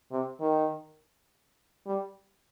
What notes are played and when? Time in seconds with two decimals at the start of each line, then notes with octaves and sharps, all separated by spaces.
0.12 C3
0.41 D#3
1.86 G3